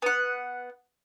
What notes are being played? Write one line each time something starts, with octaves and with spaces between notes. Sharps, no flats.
B3 F#5